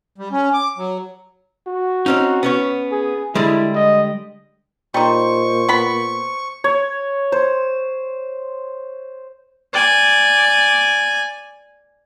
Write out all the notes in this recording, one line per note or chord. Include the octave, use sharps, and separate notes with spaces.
G3
C#4
D6
F#3
F#4
C4 C#4 D#4
B3 C#4 C#5
G#4
D3 G3 G#3 E4
D#5
A#2 G3 D#4 C5 C#6
B3 B5
C#5
C5
D5 G#5